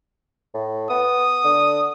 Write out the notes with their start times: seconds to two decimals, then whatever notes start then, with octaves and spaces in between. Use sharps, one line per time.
0.54 A2
0.90 B3 D#6
1.44 D3